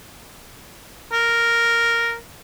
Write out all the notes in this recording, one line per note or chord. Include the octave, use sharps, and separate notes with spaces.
A#4